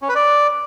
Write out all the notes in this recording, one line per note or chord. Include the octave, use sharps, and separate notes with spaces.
C#4
B4
D5